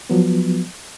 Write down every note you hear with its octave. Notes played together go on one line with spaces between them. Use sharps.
F3 F#3 B3